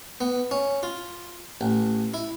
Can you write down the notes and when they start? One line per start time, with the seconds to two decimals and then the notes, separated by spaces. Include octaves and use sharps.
0.21 B3
0.51 C#4
0.83 F4
1.61 A1
2.14 E4